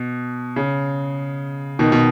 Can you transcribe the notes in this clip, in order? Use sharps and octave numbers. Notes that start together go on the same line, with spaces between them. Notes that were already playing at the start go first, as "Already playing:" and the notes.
Already playing: B2
C#3
B2 D#3
B2